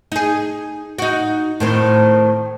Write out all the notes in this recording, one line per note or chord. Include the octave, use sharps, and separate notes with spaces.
D#4 G#4
D#4 F#4
A2 D#3 C4